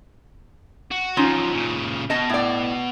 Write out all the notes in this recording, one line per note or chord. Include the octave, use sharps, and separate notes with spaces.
F#4
F3 F#3 C#4 D#4 F4
A#2 C#3
B2 D#5 A5
A2 D5